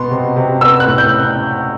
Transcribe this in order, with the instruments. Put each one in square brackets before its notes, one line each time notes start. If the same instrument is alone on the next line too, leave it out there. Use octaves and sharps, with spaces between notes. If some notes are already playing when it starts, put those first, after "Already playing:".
Already playing: [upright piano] B2 B3 C6
C3
C3
B3 E6
F#6
A2
G6